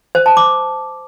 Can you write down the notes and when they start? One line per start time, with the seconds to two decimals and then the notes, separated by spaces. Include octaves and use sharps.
0.15 C5
0.26 A5
0.37 D6